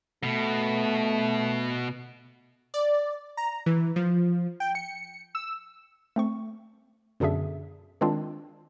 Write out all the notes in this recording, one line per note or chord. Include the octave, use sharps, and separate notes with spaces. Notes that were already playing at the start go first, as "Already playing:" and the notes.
B2 A3
D5
A#5
E3
F3
G5
C#7
E6
A3 C4 C#6
F#2 B2 D3 D4 G#4 E5
D#3 G#3 C4 D4 F4